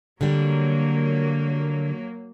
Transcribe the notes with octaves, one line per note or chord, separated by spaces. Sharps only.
D3 F#3 G3 A#3